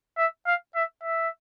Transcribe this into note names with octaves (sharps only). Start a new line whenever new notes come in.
E5
F5
E5
E5